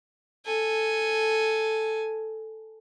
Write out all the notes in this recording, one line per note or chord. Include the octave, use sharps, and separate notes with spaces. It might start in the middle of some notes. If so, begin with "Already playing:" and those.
A4 G#5